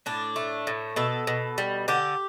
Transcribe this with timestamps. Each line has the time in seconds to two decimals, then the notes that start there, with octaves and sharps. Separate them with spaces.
0.06 A2 D4
0.36 A3
0.67 A2
0.96 B2 A4
1.27 B2
1.58 G3
1.88 D3 G4